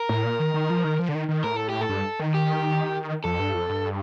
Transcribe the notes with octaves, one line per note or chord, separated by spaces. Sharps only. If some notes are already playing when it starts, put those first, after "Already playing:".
Already playing: A#4
A2
A#2
D#3
D#3
F3
D#3
F3
D3
D#3
D#3
A2 A#4
A4
G4
A4
G2
D#3
G4
F2 A4
G2
F2
G2